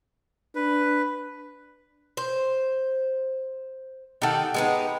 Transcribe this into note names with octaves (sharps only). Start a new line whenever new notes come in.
D4 B4
C5
D#3 D#4 G4 A4 F#5
G#3 B3 D#4